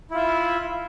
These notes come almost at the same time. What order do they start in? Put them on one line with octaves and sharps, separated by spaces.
E4 F4 E5